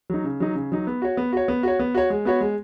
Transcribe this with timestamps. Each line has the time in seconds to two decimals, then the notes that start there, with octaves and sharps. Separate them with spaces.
0.10 F#3 D#4
0.24 C#3
0.40 F#3 D#4
0.55 C#3
0.72 F#3 D#4
0.87 B3
1.02 F#4 C#5
1.17 B3
1.33 F#4 C#5
1.48 B3
1.63 F#4 C#5
1.79 B3
1.95 F#4 C#5
2.10 G#3
2.25 B3 F#4 C#5
2.40 G#3